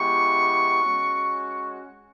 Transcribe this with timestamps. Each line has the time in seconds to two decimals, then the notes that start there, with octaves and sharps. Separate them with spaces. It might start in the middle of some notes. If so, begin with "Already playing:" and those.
Already playing: G#3 B3 E4 G4 C#6
0.82 G#3 C#4 F#4